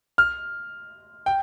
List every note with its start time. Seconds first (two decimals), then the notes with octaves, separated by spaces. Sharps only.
0.18 F6
1.26 G5